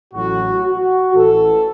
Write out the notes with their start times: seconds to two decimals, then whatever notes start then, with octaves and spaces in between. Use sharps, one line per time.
0.14 A1 A2 F#3 F#4
0.65 F#4
1.14 A1 A2 E3 A4